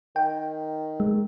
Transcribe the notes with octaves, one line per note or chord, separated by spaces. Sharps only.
D#3 G5
G#3